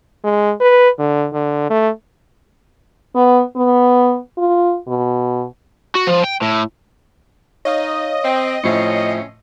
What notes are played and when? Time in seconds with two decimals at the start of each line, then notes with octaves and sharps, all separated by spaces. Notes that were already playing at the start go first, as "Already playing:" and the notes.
0.24 G#3
0.61 B4
0.99 D3
1.33 D3
1.70 A3
3.15 B3
3.56 B3
4.38 F4
4.88 B2
5.95 F#4
6.07 F3
6.24 G5
6.41 A2
7.65 D#4 C#5 D#5 F5 D#6
8.24 C4
8.64 A2 C#3 F3 C4 C#4 E5 C7 C#7